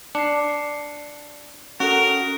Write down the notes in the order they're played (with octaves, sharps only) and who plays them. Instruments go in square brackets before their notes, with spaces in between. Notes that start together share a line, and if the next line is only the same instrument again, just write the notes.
[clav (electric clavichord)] D4 [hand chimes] C7 C#7
[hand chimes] C#4 A4 [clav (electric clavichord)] F#4 [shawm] A#4